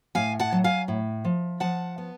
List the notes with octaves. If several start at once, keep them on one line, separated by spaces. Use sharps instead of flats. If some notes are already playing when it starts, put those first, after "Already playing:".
A2 F5 G#5
F#5 A5
F#3
F5 G#5
A2
F3
F3 F#5 A5
B3